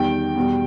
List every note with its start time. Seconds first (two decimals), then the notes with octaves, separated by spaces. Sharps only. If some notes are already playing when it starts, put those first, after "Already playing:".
Already playing: E2 D#3 G3 G5
0.36 E2 B2 G3